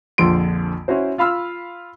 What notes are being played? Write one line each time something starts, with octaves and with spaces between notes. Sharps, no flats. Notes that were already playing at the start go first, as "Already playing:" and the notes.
A#1 F2 D3 F3 C6 D7
C#4 E4 F#4 C5
F4 F5 B5 E6 F6